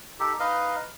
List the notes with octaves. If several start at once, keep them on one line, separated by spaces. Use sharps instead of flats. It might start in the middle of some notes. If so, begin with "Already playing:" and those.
D#4 G4 A4
D#4 B4 D#5 F5